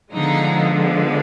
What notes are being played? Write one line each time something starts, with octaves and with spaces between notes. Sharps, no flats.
D3 F3 G#3 B3 D#4